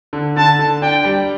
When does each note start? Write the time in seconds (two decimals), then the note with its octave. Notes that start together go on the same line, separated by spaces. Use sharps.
0.13 D3
0.36 D3 A5
0.59 D3
0.82 D4 G5
1.05 G3